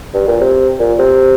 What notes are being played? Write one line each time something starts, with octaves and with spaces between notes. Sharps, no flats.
G2
A#2
C3
A#2
C3